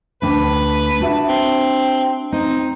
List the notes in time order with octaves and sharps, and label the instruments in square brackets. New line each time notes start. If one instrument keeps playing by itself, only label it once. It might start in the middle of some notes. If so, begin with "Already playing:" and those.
[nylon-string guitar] D2 D4 G5 [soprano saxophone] B4
[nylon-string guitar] D4 F#4 E5
[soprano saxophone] C4
[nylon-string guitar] C4 [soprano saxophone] D#4